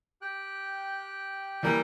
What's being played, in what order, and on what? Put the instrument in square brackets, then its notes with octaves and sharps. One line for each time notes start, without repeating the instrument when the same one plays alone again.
[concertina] G4 G5 F#6
[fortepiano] E3 A#3 [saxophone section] G3